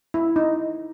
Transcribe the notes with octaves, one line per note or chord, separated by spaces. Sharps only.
E4
D#4